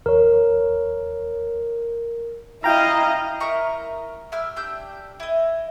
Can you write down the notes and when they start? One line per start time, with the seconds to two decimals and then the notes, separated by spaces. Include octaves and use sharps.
0.06 D#2 A#4 C#5
2.64 E4 D#5 F5 G5 A#5
3.40 A#4 E5 A#5 C#6
4.32 E4 G4 E6 F6
4.56 D4 G4 E6 G6
5.20 E4 D#5